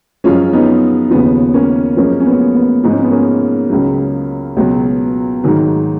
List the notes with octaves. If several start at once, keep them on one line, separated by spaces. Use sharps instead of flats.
F#2 F3 G#3 C#4 F4
B3 D#4
D#2 C#3 F3 B3
A#3 C#4
F#2 F3 G#3 A#3 C#4
C#4
B3
B3
G#2 F3 G#3 D#4
C#4
B3
A#3 C#4
C#2 C#3 F#3
C#2 B2 F#3
G#2 D#3 F#3